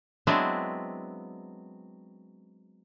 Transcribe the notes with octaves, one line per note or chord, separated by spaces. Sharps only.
F#3 G#3 B3 C4 D4 E4